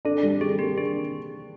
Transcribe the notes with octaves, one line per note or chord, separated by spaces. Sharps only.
D4 A4
G3 A4
G3 G#4
A#3 G4
D4 G#4